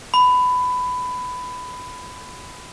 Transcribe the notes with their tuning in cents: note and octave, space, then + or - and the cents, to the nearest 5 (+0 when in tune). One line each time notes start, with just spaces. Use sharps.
B5 +20